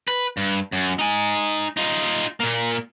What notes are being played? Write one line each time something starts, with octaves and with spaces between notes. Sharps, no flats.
B4
G2
F#2
D#4 G#5
D#4 F4
A#2 A#3